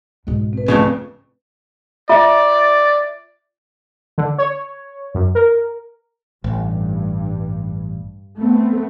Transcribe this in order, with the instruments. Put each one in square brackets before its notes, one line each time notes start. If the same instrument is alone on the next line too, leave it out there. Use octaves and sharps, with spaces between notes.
[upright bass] B1 G#2
[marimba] C4 B4
[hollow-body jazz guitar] F2 A2 C#3
[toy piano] F4 E5 [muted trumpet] D5
[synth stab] D3
C#5
F#2
A#4
[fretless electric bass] A1 [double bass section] G2
[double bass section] A3 B3 C4